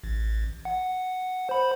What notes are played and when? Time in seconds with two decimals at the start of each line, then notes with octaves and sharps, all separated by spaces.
0.04 A1
0.65 F#5
1.49 C5 B5